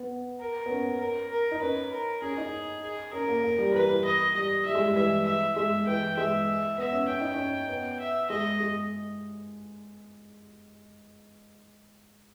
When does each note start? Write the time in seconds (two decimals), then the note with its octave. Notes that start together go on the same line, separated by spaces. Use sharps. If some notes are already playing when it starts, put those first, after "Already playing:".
Already playing: B3
0.40 A#4
0.66 B3
0.70 C#4
1.00 A#4
1.31 A#4
1.51 D#4
1.61 C#4 B4
1.92 A#4
2.22 C#4 G#4
2.37 D#4
2.83 G#4
3.13 C#4 A#4
3.28 A#3
3.43 A#3
3.58 G3
3.74 E3 B4
3.89 E3
4.04 D#5
4.34 G3 D#5
4.65 G3 E5
4.75 G#3
4.86 G3
4.96 E3 E5
5.26 E5
5.56 G#3 E5
5.87 E3 G5
6.17 G#3 E5
6.78 B3 E5
6.93 C#4
7.08 C#4 G5
7.21 D#4
7.34 C#4
7.69 B3
7.99 E5
8.30 G#3 D#5
8.60 G#3